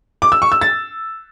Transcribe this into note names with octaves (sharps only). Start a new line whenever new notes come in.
D6
E6
C#6
E6
A6